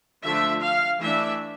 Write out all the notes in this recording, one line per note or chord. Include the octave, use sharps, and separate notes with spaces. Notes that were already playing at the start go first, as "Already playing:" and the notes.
D3 F3 A3 D4 E5
F5
E3 A3 D4 E5